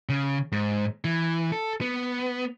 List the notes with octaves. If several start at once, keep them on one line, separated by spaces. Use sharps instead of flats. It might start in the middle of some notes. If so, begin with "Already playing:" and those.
C#3
G#2
E3
A4
B3